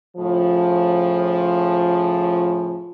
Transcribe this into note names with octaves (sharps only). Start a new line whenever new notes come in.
A2 C#3 F3